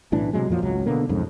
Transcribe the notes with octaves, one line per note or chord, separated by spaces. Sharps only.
B1 A2 E3 D4
C3 D#3 F#3 G#3
F2 A#2 F3 F#3
G#1 C#2 F#3
B2 D3 A#3
B1 F2 G#2 C#3